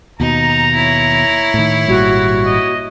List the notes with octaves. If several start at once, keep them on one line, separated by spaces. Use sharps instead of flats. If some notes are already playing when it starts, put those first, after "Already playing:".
D#2 B2 D#4 A#5
E4 C#5
A2 D#3
G#1 A#2 G3 F#4
D#5